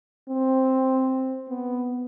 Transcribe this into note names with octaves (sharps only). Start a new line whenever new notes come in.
C4
B3